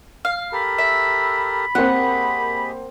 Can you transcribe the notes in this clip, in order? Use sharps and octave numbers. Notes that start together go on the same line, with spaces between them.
F5
G4 A4 A#4 B5
E5
A#3 C4 G4 G#4 D#5 F#5